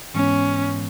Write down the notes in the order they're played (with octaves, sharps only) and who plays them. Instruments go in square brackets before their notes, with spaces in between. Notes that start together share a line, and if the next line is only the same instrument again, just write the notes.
[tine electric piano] G#2 E3 G#3 B3 [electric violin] C#4